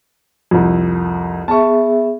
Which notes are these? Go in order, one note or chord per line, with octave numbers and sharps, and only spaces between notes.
C2 F2
B3 G#4 E5 A5 C#6